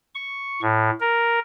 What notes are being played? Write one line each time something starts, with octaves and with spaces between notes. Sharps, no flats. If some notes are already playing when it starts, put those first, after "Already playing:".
C#6
A2
A#4